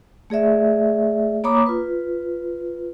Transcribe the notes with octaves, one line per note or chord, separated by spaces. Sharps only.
A3 G#4 D5 E5
A#3 C#5 A#5 B5 D6 D#6
F4 B4